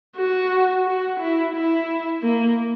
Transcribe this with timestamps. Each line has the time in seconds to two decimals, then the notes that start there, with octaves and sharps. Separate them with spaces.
0.17 F#4
0.86 F#4
1.20 E4
1.55 E4
2.23 A#3